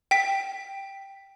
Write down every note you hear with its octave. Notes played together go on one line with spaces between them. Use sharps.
G5 B6